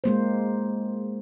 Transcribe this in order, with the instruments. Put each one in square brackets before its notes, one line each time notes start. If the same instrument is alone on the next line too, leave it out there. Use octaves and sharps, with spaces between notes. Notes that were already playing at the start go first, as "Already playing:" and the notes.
[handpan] G#3 A#3 C5